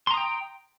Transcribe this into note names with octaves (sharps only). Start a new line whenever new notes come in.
G5 A#5 C6 D#6